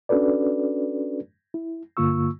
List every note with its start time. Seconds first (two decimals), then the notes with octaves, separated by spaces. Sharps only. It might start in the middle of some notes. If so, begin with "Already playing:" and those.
0.09 C#4 D4 F#4 A4 B4 D5
1.54 E4
1.97 G2 D3 A#3 F4 C#6 E6